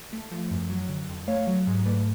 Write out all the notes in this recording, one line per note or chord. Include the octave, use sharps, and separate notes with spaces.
A3
F3
F#2
F#3
D3
F2
A3 C#5 F5
F#3
G#2
A3 B4 D5